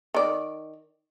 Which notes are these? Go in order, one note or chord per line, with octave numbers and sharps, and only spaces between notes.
D#3 D5